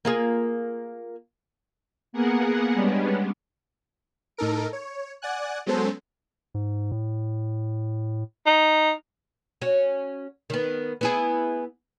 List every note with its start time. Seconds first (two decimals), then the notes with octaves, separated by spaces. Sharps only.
0.05 A#3 F4 G#4
2.13 A#3 B3 G#4 A#4 F#5
2.74 G3 G#3 B3 C#4 D4
4.37 A2 D#4 A4 A#4 D7
4.73 C#5
5.22 D5 F#5 G#5 F#6
5.66 F#3 G#3 B3 C#4 A4 C5
6.54 G#2
6.92 A2
8.46 D#4
9.62 C#4 F#4
10.50 D#3 B3
11.01 B3 E4 G#4